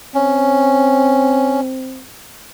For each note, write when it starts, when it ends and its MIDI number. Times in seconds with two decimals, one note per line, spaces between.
0.14 2.04 60
0.14 1.61 61